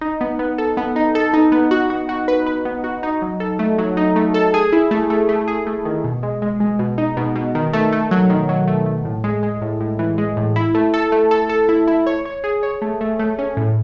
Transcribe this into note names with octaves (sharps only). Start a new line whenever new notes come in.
D#4
B3
B3
A4
B3
D#4
A4
D#4
B3
F#4
F#4
F#4
B4
B4
B3
F#4
D#4
F#3
A4
A3
F#3
D#4
A3
A4
G#4
E4
A3
A3
A3
G#4
A3
D#3
B2
G#3
G#3
G#3
B2
D#4
B2
B2
D#3
A3
A3
F#3
D#3
F#3
A3
A3
A2
G#3
G#3
A2
A2
E3
G#3
A2
E4
A3
A4
A3
A4
A4
E4
E4
C#5
C#5
G#4
C#5
A3
A3
A3
C#4
A2